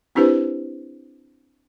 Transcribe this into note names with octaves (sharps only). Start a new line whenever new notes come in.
C4 D4 E4 G4 B4 C5